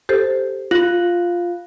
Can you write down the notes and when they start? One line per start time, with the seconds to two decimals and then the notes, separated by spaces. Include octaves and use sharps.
0.09 G4 A4 C5
0.71 F4 F5